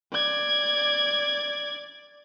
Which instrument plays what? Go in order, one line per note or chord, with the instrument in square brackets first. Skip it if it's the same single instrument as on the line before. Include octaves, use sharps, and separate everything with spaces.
[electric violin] D5 G#6